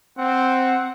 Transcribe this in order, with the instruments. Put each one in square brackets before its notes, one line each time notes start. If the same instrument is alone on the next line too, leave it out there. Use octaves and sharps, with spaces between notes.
[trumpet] C4 [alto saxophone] F#5